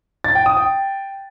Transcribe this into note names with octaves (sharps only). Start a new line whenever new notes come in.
A6
G5
D#6
G5